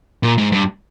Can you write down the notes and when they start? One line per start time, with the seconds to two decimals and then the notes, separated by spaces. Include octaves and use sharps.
0.23 A#2
0.38 G#2
0.52 G2